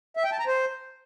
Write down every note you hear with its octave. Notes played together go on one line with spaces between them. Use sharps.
E5
G5
A5
A#5
C5